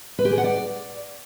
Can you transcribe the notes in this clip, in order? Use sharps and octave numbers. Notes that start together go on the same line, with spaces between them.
B4
G4
G#4
F#5
D5